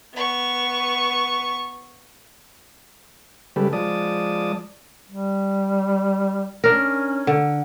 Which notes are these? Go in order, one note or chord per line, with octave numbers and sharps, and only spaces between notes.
B3 C#6
C#3 G3 G#3 G4 A4 B4
F3 G#3 D5 A5 D#6
G3
C#4 D4 A#4
D3